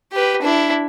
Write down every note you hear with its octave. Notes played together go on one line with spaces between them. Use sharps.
G4 B4
D4 E4